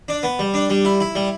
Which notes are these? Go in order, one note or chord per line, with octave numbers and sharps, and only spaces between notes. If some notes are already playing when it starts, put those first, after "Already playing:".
D4
B3
G3
D4
G3
E4
E4
G3